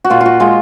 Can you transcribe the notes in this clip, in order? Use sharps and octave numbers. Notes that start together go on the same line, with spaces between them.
F#4
A#2 F4
F4 F#4
G#3 F4